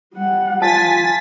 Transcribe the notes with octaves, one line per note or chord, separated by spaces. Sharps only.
G3 F#5
F4 G#5 A5 A6 B6